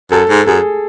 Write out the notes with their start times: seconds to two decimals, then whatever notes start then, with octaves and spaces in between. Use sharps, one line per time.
0.11 F#2 A4
0.29 G#2
0.47 F#2 G#4